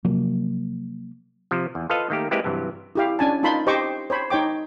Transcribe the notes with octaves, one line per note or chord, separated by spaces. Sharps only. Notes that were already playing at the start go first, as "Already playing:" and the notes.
C3 F3 F#3 A#3
C3 F3
E2
F4 A4 B4 C5 D#5 F5
D#3 A3 A#3 G4
G#3 A#3 C4 E4 G4 B4
G2 C3 E3 F#3
E4 G4 F5
C#4 D4 G#5 A5
D#4 F4 A5 B5 C6
G4 C5 D#5 G5 C#6 D6
C5 C#5 B5
D#4 C#5 G5 D6